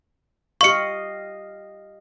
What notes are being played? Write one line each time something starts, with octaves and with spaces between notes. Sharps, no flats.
G4 D#5 F5 C#6 C#7